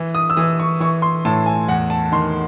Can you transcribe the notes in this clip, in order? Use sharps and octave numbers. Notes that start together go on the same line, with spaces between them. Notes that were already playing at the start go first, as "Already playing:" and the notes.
Already playing: E3
D#6
E6
E3 D#6
C#6
E3 C#6
C6
A2 A5
G#5
E2 F#5
A5
D#3 C6